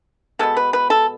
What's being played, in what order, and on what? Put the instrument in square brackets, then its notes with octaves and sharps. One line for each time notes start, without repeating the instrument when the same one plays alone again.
[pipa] B2 G#3 B3 A4
B4
B4
A4